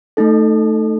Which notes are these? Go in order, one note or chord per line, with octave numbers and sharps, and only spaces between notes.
A3 D#4 A4